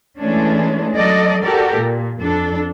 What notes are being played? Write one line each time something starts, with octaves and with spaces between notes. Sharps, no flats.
E3 G#3 A3 C#4 D4
F#3 A4 D5 D#5
F#4 G4 A4 A#4 D5
A#2
F2 D4 A4